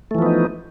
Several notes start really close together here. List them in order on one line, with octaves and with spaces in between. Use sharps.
A3 E3 F3 B3 D#4